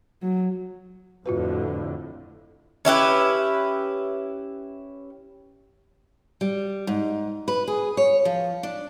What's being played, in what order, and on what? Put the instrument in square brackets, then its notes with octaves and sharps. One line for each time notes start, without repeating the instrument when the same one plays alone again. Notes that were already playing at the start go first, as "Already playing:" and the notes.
[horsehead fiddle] F#3
[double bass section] F2 A2 D3 [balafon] F4 F#4 B4
[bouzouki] C#4 E4 G4 B4
[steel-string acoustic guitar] G3
G#2
B4
G#4
C#5
F3
D4